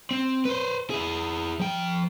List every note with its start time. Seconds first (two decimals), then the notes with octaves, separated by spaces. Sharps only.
0.11 C4
0.45 B4 C5
0.90 E4 G#4
1.59 F3 G5